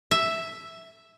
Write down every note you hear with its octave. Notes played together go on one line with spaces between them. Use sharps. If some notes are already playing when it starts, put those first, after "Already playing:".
E5